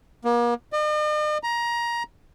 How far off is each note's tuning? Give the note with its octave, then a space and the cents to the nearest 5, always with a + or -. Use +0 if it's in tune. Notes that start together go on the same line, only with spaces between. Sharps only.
A#3 +40
D#5 -45
A#5 +20